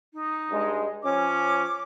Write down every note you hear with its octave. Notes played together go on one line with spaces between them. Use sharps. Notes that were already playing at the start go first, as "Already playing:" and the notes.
D#4
G2 G#3
F3 C#4 D6